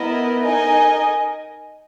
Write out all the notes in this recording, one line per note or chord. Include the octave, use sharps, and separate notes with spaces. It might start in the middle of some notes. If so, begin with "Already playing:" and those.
Already playing: B3 E4 A#4 D#5
D#4 A#4 D#5 G#5